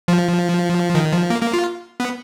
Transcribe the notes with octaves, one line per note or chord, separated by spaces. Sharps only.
F3
D#3
F3
A#3
A#3
F4
B3